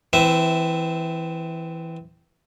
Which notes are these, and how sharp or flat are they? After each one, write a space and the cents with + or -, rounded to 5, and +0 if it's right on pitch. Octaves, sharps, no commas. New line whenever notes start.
E3 +0 C4 -20 E5 -5